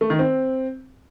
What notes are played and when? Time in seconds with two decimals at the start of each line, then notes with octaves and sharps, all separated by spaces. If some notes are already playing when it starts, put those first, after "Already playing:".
0.01 A3
0.10 D#3
0.19 C4